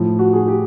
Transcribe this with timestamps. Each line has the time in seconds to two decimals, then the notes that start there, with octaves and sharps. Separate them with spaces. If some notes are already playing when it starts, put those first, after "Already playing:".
Already playing: A2 F3
0.19 F#4
0.33 G#4
0.48 G4